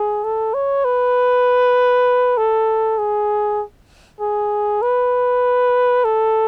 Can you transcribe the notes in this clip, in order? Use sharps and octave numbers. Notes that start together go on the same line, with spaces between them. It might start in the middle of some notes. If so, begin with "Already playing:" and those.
Already playing: G#4
A4
C#5
B4
A4
G#4
G#4
B4
A4